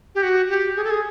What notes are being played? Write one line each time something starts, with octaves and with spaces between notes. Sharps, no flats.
G4
F#4
G4
G#4
A4
G#4